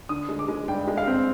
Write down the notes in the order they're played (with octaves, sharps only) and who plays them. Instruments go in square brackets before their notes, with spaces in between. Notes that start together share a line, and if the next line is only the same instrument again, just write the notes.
[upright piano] D3 D#6
G#3
D6
G#3
G2 G5
G#3
F5
C4